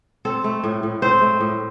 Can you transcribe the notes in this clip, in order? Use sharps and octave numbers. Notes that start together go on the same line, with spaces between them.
C4 A4
A3
A2
A2
C4 C5
A3
A2